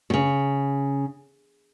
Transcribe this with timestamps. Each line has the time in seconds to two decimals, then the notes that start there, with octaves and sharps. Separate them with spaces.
0.10 B2
0.14 C#3